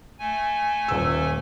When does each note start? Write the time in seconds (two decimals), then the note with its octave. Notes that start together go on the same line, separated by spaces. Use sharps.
0.19 A3 G#5
0.88 D#1 E6